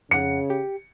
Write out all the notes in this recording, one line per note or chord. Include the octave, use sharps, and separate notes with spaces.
F2 C#3 F#5 C#7
G4